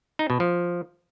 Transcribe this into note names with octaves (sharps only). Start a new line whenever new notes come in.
D#4
B2
F3